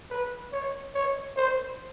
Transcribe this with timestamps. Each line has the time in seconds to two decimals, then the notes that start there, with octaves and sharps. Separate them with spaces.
0.11 B4
0.53 C#5
0.95 C#5
1.37 C5